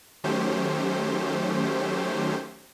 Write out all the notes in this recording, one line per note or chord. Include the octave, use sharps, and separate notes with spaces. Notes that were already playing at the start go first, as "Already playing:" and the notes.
D#3 F#3 A3 C#4 G4 C5